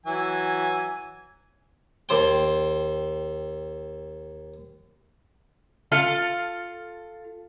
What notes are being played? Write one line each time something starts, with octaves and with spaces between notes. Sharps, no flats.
E3 F#3 G#5
D#2 C5 G5
F4 A4 F5